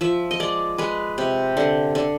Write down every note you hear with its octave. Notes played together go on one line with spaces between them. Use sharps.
F3 E5
D#5
G#3 D5
G#3 B4
C3
D3
D3